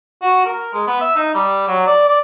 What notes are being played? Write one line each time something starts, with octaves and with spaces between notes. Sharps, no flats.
F#4
A#4
G#3
B3
E5
D#4
G3
F#3
D5
D5